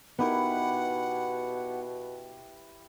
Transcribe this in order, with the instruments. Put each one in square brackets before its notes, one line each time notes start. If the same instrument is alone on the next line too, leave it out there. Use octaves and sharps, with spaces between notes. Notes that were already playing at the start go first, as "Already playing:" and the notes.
[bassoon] B2 [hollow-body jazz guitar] B3 D#4 A#4 [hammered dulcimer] E4 G4 B4 [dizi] F#5